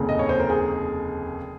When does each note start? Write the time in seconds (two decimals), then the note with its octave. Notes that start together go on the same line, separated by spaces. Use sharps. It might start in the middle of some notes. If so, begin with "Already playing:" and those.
Already playing: F1 D#2 C#3
0.09 D#5
0.19 C#5
0.29 C5
0.40 A#4
0.50 G#4